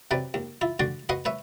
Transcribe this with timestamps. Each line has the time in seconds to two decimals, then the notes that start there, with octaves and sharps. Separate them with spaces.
0.11 C3 F#3 B4 D5
0.34 D#2
0.61 E4 F4
0.80 D3 F#4 D5 C6
1.09 F#4 B4 D#5 F#5 C6 D#6
1.25 B4 C#5 E5